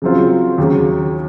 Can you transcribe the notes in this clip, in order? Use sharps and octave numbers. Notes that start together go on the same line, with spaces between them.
C#3 F#3 C4 F4
D#2 C#3 F#3